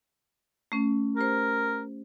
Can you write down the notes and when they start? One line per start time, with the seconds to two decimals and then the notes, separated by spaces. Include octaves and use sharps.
0.72 A3 C#4
1.17 G4 A#4 C5